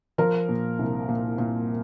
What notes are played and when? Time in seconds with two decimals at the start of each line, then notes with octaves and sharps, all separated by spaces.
0.18 F3 A#4
0.49 A#2
0.79 C2
1.08 A#2
1.38 A#2